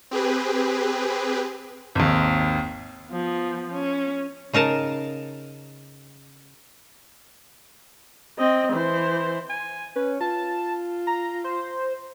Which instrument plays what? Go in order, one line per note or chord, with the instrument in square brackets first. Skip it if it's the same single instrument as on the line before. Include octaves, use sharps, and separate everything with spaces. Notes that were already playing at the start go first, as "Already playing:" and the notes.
[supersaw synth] C4 G4 G#4 B4
[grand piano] G#1 D#2
[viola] F3 B3
C#4
[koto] C#3 D#4 A#4 A5
[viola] C4 D#5
E3 C5
[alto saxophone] G#5
[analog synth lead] C#4 [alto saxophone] B4
[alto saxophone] F4 [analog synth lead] A5
[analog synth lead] A#5
C5